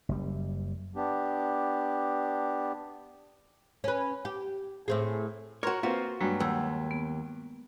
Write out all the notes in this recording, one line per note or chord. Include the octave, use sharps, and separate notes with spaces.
F#1 G3
B3 D4 G4
C#4 B4
G4
A2 C4 G#4
F#4 A#4 C#5 C6
A#3 C4 F4 F#4 B4
G2 F#3 G#3 A#3
D#2 F#5 E6
B3